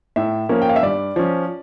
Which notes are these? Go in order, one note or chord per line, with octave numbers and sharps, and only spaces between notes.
A2 E5
F3 A#3 C#4
G5
F5
E5
G2 D5
F3 C#4